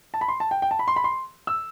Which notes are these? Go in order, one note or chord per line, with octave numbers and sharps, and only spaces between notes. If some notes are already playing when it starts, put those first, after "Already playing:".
A5
B5
C6
A5
G5
G5
A5
B5
C6
B5
C6
E6